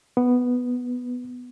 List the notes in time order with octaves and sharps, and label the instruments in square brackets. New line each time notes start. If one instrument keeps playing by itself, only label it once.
[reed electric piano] B3